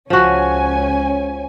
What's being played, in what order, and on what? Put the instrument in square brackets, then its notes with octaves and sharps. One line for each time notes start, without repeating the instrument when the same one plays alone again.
[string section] C#2 C#4 G#5 [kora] F3 F#4